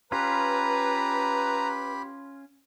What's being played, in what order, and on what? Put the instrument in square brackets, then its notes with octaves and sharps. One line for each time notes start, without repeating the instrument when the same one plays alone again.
[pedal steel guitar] C#4 F4 [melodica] G4 B5 [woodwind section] B4 [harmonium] A#5